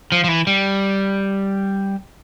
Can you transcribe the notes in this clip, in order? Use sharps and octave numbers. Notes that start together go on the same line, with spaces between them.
F3
F3
E3
G3